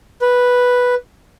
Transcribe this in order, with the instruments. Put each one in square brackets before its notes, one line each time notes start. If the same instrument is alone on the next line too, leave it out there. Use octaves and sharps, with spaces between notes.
[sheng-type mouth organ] B4